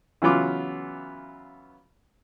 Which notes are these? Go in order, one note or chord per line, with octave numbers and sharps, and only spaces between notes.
C#3 E3 F#3 B3 F4 D6